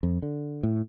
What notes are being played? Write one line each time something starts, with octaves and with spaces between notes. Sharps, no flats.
F2
D3
A2